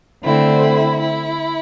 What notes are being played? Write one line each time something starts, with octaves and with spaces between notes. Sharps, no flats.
D3 A3 C4 E4
E4